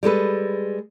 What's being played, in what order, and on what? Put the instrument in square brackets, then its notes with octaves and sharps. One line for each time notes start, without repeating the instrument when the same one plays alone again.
[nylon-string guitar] G3 G#3 A4 B4